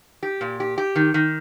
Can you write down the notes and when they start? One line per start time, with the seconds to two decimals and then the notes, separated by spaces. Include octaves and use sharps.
0.23 G4
0.41 A#2
0.60 G4
0.78 G4
0.96 D#3
1.14 D#3